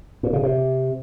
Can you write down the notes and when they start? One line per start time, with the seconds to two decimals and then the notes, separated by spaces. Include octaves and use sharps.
0.23 A#2
0.33 C#3
0.43 C3